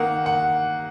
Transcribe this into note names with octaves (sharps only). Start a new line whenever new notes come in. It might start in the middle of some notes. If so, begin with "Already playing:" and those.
Already playing: D#3 A#3 F#5
F#5